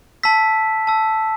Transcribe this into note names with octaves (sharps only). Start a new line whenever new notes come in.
A5 E6 B6
A5 E6